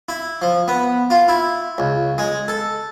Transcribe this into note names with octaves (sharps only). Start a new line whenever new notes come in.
E4
F3
B3
F4
E4
C#2
G#3
A4